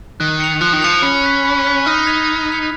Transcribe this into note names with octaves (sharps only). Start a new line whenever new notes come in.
D#3 F#6
C#7 F7
F3 F#6
D#3
F3 C#7 F7
C#4 B5
F#6 B6
B5
F#6 B6
D#4 F6
G#6 B6 F7
F6
G#6 B6 F7